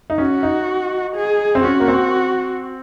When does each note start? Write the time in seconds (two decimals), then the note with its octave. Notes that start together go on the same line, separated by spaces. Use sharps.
0.10 D#4
0.18 C#4 F#4
0.43 D#4
1.15 G#4
1.55 C4
1.63 C#4 F#4
1.80 A#3
1.88 C4